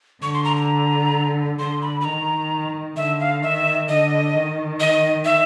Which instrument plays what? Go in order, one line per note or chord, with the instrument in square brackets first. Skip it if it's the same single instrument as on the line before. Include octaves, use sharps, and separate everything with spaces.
[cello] D3 [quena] C#6
[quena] C6
A#5
A#5
[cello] D3 [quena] C6
[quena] B5
B5
[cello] D#3 [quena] A#5
[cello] D3 [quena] E5
[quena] F5
[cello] D#3 [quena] E5
[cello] D3 [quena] D#5
[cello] D#3
[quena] D#5
E5